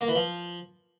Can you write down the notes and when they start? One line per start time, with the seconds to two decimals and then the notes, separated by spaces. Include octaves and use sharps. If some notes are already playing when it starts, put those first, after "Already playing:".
0.01 A#3
0.08 E3
0.15 F3